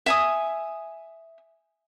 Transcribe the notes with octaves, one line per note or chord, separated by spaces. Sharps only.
E5 G#5 D#6